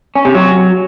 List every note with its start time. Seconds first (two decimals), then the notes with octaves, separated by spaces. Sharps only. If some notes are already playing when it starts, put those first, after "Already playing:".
0.16 C#4
0.25 C3
0.35 F#3